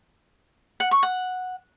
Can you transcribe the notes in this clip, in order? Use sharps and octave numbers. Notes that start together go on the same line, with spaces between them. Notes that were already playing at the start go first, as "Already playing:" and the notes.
F#5
C#6
F#5